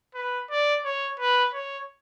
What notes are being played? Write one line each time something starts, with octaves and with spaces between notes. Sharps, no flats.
B4
D5
C#5
B4
C#5